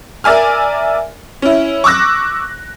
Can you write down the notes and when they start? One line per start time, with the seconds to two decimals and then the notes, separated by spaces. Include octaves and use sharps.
0.24 A#4 D5 E5 G#5 F6
1.42 C#4 E4
1.84 C#6 D6 E6 F#6 A#6